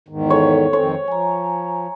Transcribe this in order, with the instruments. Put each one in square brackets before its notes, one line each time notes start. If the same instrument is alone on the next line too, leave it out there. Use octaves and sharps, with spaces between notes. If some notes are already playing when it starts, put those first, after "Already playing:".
[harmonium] E2 G#2 D#3
[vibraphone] A4 [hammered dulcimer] C#5
[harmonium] F2 D#3 C4 [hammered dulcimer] C#5
[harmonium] F3 [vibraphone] G#5 A#5